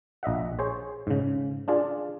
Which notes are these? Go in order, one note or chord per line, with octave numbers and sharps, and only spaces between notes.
A#1 D#5 E5 F#5
G#4 C5 C#5
G#2 C#3
D4 F4 G#4 D5